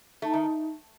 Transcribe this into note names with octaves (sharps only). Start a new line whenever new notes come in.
A3 D#4
D#3